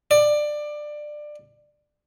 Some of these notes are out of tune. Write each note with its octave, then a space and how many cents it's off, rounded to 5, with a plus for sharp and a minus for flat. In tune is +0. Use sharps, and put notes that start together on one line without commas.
D5 +20